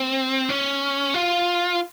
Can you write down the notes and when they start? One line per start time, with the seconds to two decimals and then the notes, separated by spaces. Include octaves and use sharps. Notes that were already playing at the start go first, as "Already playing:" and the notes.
Already playing: C4
0.49 C#4
1.14 F4